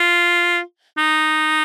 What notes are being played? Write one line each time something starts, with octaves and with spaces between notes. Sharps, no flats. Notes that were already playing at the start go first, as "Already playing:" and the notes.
Already playing: F4
D#4